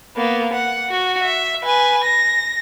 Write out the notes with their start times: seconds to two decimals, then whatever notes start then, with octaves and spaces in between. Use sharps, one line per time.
0.16 A#3 B3
0.53 F#5
0.90 F#4
1.23 E5
1.64 B4 G#5
2.04 A#6